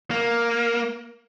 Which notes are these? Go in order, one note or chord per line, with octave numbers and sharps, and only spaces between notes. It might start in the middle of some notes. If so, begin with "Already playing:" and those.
A#3